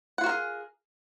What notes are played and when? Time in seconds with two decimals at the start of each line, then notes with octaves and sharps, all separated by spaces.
0.18 F#5
0.21 F4
0.24 F#4
0.26 A#4
0.29 G#4